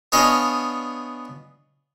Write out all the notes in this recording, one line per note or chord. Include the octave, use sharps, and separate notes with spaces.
B3 D4 C#5 D#5 F5 G#5